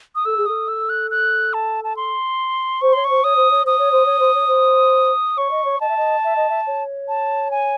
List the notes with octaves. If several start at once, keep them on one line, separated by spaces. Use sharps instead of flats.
D#6
A4 E6
G#4
A4 D#6
E6
F#6
F#6
A5
A5
C6
C5 C#6
C#5 C6
C5 C#6
C#5 D#6
C5
C#5
C5 D#6
C#5
C5
C#5
C5
C#5
C5
C#5 C#6
D#5
C#5
D#5 A5
E5
D#5
E5
D#5
E5
C#5
A5
G#5